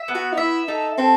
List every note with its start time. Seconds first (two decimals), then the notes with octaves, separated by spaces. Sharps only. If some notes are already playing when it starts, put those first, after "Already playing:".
Already playing: E5
0.08 B3
0.15 F#4
0.32 D#4
0.37 E4 E5
0.68 D#4 A4
0.98 C4 A4